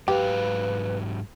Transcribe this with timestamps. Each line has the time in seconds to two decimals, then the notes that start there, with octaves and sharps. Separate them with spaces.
0.08 G#2 F#3 G4 B4 F5